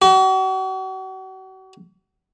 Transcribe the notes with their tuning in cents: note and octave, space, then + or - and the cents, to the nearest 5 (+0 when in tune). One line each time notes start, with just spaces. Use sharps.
F#4 +40